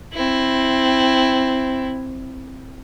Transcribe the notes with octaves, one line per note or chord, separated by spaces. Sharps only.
C4 E4